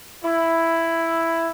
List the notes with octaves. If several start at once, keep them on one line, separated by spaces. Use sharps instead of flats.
E4